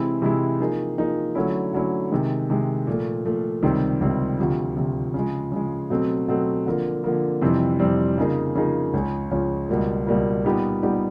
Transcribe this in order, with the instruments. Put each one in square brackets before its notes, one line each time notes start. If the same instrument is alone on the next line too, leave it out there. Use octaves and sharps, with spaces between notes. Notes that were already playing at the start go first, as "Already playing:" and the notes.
Already playing: [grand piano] C3 E3 G#3 C4 E4
C3 E3 G#3 C4 E4
F3 A#3 D#4 G#4
F3 A#3 D#4 G#4
D3 F#3 A3 C#4 E4
D3 F#3 A3 C#4 E4
C3 D#3 G#3
C3 D#3 G#3
A#2 F3 A3
A#2 F3 A3
C#2 C3 D#3 G3 C4
C#2 C3 D#3 G3 C4
D2 C3 F3
D2 C3 F3
C#3 F3 G#3
C#3 F3 G#3
B2 F#3 A3 C4
B2 F#3 A3 C4
D3 F3 A#3
D3 F3 A#3
F2 C3 E3 G3 C4
F2 C3 E3 G3 C4
C#3 F3 A#3 D#4 G#4
C#3 F3 A#3 D#4 G#4
C#2 C#3 F3 G#3 C#4
C#2 C#3 F3 G#3 C#4
C#2 B2 G3 A#3
C#2 B2 G3 A#3
A#2 G3 B3 D#4 G4
A#2 G3 B3 D#4 G4